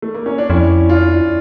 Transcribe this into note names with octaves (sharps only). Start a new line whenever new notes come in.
A3
A#3
C#4
D4
F2 C#4 E4
D4 F4